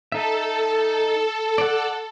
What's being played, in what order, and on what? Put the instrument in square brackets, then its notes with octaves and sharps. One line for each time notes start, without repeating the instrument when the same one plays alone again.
[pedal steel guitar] D#4 E5 [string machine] A4
[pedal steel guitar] D5 F#5